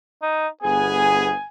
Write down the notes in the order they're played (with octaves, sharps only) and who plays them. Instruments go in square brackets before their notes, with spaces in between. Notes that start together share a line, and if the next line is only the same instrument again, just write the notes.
[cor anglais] D#4
[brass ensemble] G1 B3 G#4 [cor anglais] G#5